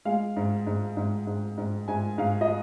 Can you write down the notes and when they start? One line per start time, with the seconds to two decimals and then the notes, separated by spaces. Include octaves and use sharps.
0.05 G#3 F5
0.36 G#2
0.67 G#2
0.97 G#2
1.27 G#2
1.58 G#2
1.88 G#2 G#5
2.18 G#2 F5
2.41 D#5